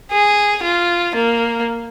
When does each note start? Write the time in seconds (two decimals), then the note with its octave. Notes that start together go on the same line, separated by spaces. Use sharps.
0.11 G#4
0.62 F4
1.15 A#3